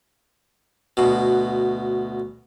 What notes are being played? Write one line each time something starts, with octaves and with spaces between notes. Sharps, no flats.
D2 B2